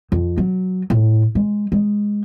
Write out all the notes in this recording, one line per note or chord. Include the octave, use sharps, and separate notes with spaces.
F2
F#3
A2
G#3
G#3